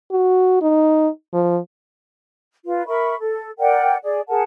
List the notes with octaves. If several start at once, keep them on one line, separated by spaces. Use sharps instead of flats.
F#4
D#4
F3
F4 B4
A#4 E5 B5 C#6
A4
A#4 D5 F#5 G5
G#4 D5
G#4 A#4 F#5 A5